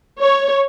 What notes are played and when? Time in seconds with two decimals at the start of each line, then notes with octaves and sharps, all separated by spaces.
0.20 C#5